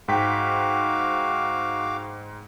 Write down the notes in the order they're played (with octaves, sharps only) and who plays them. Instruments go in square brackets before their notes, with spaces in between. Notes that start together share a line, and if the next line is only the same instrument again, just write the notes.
[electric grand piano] G#2 G5 B6 [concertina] F#4 F5 D6